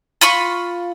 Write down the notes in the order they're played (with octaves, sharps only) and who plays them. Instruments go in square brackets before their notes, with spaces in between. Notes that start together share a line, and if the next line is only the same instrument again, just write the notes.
[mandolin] F4 B5 C#6